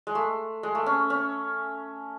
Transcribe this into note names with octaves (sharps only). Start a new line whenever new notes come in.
G#3
A3
G#3
A3
C#4
C#4